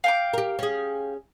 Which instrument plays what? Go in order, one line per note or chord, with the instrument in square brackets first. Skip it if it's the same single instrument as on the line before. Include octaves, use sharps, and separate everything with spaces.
[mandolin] F5 G5 D6
[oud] G4 A#4
C#4 G#4